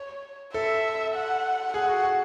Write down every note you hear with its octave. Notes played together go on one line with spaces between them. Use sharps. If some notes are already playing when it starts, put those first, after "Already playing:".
Already playing: C#5
A4 E5
F#5
G#4 F#5
F#4
F#4